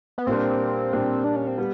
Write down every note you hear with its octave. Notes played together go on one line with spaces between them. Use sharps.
B3
A#2 G3 A#3 C4 D4
A#2 G3 A#3 D4
D4
C#4
C4
G3 B3